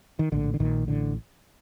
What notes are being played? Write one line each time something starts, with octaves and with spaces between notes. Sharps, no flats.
D#3
A#1 A2 D3
D3
A#1 A#2 D#3
A1 A2 D3